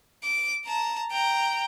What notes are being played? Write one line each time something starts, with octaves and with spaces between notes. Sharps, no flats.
D6
A5 A#5
G5 A#5